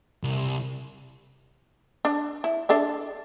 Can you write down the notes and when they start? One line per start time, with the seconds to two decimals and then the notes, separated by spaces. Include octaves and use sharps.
0.23 C2
2.05 D4
2.44 E4
2.69 D4 A4 E5